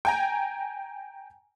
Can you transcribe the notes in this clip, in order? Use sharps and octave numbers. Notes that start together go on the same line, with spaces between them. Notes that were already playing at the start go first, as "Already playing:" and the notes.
G5 G#5 A#5